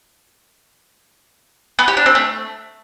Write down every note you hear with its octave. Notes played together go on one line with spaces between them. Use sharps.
B3
G4
D4
C4
A3